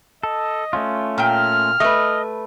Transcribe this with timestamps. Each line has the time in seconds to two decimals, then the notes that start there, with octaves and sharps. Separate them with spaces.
0.23 A4 D#5
0.73 A3 C#4 F4
1.18 A#2 G5 F6
1.80 A3 B4 D#5